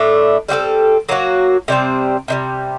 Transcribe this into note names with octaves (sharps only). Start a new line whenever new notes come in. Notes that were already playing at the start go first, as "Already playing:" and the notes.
Already playing: A2 A3 D4
G3 C4 F#4 A4
F#3 A#3 D#4 F#4
C3 G3 C4
C3 D#3 G3